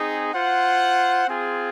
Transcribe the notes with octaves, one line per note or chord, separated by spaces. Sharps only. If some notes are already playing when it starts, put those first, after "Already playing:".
Already playing: C4 D#4 G#4
F4 C5 F#5
C4 F4 G#4